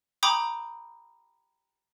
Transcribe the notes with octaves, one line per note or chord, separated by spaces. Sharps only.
G5 A#5 B5 D6 D#6 G6